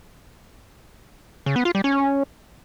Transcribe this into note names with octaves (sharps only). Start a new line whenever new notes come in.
C#3
B3
F4
G3
C#4